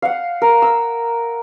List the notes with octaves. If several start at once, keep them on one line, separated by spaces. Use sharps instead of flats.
F5 F#5
A#4
E6